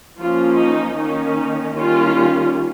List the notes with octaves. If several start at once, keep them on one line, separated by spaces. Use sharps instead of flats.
F3 A#3 C#4 F4
D#4
D#3 A#3 C#4 D#4
D#3 G3 A#3 C#4 F4